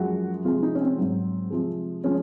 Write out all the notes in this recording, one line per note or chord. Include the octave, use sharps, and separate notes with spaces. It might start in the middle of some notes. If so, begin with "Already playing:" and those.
Already playing: F#2 F3 G#3 F#4
C3 F3 G#3 F4
D#4
C#4
C4
G#2 F#3
C3 F3 G#3
F3 G#3 C#4